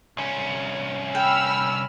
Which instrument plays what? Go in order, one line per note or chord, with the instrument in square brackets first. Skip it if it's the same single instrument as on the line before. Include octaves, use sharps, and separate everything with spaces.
[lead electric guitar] C2 C#4
[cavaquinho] G5 [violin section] B5 E6 F6